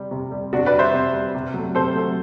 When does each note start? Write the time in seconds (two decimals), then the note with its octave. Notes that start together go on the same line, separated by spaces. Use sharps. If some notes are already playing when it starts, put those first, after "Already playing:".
Already playing: C3 G3
0.11 C3
0.31 G3
0.52 C3 D4 F#4
0.66 B4 D5
0.73 G3
0.79 C5 E5
0.94 C3
1.13 G3
1.35 C3
1.54 F#3 A3
1.75 C3 A4 C5
1.95 F#3 A3